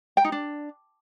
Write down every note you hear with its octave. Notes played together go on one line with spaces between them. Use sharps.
G5
D#4
D4